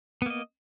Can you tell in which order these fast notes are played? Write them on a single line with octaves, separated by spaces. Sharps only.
B3 A#3 D#5